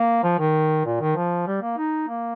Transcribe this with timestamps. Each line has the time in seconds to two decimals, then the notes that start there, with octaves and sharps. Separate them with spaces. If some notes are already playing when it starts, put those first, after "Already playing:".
Already playing: A#3
0.24 F3
0.39 D#3
0.86 A#2
1.01 D#3
1.16 F3
1.47 G3
1.62 A#3
1.78 D#4
2.08 A#3